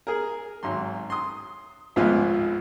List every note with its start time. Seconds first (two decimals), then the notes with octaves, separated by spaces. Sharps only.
0.07 G#4 A#4
0.63 G#1 F#3 C6
1.10 C6 D#6
1.96 G#1 C#2 A2 F3 B3 F4